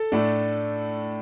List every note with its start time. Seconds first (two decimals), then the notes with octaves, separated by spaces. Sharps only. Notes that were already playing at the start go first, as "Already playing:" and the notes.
Already playing: A4 A5
0.12 A2 A3 D4